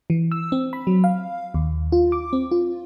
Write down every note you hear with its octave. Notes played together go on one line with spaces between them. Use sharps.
E3
E6
C4
B5
F#3
F5
D#2
F4
D6
C4
F4